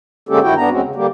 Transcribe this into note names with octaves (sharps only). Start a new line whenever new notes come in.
D3 G#3 A#3 C#4 G4 A4
G2 D#3 E4 F#4 G5
G2 B3 D4 A#5
E2 G#3 C4 C#4 F#4
C#3
D3 G3 A#3 G4